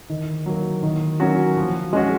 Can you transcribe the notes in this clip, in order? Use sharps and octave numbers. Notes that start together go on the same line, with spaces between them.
D#3
F#3 A#3
D#3
F#3 A#3 C#4 F#4
F3
G#3 C#4 F#4